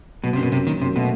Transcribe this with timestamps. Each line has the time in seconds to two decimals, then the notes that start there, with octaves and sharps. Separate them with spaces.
0.24 B2 F#3
0.33 C3
0.37 F#2
0.43 B2
0.52 F#2 C3
0.67 D#3 F#3
0.81 F#2 C3
0.96 B2 A3